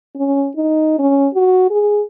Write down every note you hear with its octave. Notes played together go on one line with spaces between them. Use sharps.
C#4
D#4
C#4
F#4
G#4